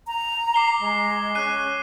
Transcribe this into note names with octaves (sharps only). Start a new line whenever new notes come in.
A#5
D6 C7 G7
G#3
C#4 F#6 D#7